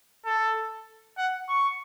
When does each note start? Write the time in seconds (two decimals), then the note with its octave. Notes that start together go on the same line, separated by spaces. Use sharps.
0.26 A4
1.18 F#5
1.49 C#6